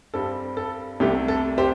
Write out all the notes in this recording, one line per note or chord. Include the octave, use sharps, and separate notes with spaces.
G2 G3 C4 A4
A4
C2 C3 A3 G4
A4
G4 C5